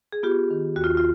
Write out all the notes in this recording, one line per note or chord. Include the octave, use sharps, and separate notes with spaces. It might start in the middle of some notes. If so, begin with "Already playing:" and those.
G#4
B3 F4 G4
D#3
D#2 F#4
F4
F4